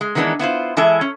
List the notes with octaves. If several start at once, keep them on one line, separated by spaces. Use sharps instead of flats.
G#3
D#3 E3 G#3 B3 D4 D#4
B3 E4 F4 C5
E3 G#3 E4 A4 E5
C#4